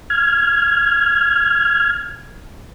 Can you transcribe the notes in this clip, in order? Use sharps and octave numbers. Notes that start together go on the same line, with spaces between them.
F6 G#6